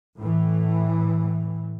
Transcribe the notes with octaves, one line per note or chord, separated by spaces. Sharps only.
A2 E3